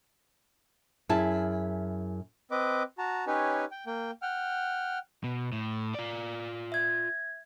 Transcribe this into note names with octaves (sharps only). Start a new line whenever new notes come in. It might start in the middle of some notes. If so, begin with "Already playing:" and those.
F#2 E4 G#4 A5
C4 B4 D#5 D6
F#4 A5 A#5
C#4 D#4 G4 B4 C#5 G#5
G5
A#3 G5
F#5 G5 F6
B2
A2
F4 D5
E5 G#6